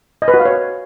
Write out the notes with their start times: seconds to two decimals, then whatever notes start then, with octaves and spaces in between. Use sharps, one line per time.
0.22 D#5
0.28 B4
0.34 F#4
0.40 F5
0.45 C#5